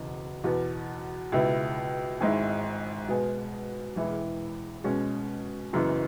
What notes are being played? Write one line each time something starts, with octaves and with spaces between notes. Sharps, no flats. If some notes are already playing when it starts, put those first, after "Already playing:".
Already playing: F#1 E2 B2
E2 B2 B3
C#2 B2 B3 E4
G#1 G#2 G#3 E4
B2 G#3 B3 G#4
E1 E2 E3 G#3 E4
B2 G#3 C#4
F#1 F#2 E3 B3